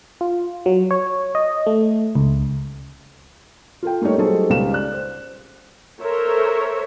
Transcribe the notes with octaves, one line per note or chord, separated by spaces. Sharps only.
F4
F#3
C#5
D#5
A3
C#2
F4 A4 G5
G3 A3 A#3 D#4 C#5
F#3 G3 D#4 G#4 A4 C5
C#2 G3 F5 E7
D5 F#6
C5
A4 A#4 C5 C#5 E5